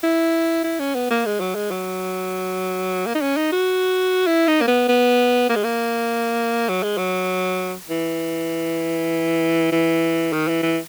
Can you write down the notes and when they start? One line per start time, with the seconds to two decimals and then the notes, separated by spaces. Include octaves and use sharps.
0.03 E4
0.64 E4
0.80 C#4
0.95 B3
1.10 A#3
1.26 G#3
1.40 F#3
1.55 G#3
1.71 F#3
3.06 A#3
3.15 D#4
3.21 C#4
3.37 D#4
3.52 F#4
4.27 E4
4.48 D#4
4.61 A#3
4.67 B3
4.88 B3
5.49 A#3
5.56 G#3
5.64 A#3
6.69 F#3
6.83 G#3
6.97 F#3
7.90 E3
9.72 E3
10.33 D#3
10.48 E3
10.63 E3